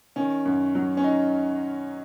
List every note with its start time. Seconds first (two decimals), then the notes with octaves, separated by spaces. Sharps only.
0.16 D#3 C#4
0.45 F#2
0.75 F#3
0.97 C#4
1.04 D#4